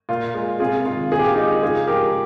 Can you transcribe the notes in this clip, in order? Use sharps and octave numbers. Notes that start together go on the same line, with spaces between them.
A#2 F4
G#3
C3 F4 G#4
D#3 G#3 F4
A#2 G#4
G4
F4
G#3 D#4 G4
C#3 F4 G#4
F3 G#3 G4 A#4